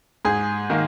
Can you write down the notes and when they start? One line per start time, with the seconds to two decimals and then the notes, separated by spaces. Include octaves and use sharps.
0.25 G#2 G#4
0.70 D#3 A#3